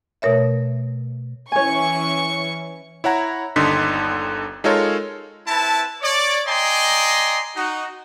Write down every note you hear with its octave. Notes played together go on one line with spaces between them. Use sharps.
B2 A3 A#4 C#5 E5
E3 C#4 C#5 G#5 C#6
E4 C#5 F#5 A#5
G1 D#2 D3 D#4 C6 B6
G#3 D#4 F4 A4 A#4 C#5
C4 E4 B4 E5 A5
C#5 D5
D5 D#5 G5 G#5 A#5 C6
D#4 F#4